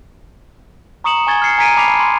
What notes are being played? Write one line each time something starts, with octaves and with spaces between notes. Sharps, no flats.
A#5 C#6 D#6 C#7 E7 F#7
G#5 C#6 G#6 A6 G7
F6 G#6 C7 C#7
G#5 A#5 G#6 B6 D7 D#7
A5 B5 D6 B6 C7 F7
C6